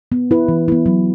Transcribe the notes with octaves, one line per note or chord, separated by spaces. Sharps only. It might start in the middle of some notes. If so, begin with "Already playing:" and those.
B3
E4 B4
E3
B3 E4
F#3